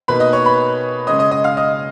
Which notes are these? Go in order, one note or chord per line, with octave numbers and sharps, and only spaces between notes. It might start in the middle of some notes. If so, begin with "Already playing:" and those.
B2 A#3 D#4 B4 B5
D#5 D#6
C#5 C#6
B4 B5
C#3 G#3 C#4 D#5 D#6
D#5 D#6
D#5 D#6
F5 F6
D#5 D#6